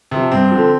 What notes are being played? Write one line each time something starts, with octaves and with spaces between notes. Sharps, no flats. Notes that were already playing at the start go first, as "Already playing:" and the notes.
C3 F3
G2 C4
D3 F3